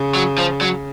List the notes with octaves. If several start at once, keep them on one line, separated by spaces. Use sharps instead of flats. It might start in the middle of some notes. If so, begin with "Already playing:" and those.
Already playing: C#3
F#3
F3
F#3